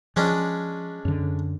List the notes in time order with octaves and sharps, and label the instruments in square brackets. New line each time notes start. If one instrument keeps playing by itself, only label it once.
[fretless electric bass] F3 [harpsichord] G#3 C#4 D4
[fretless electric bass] F#2 D3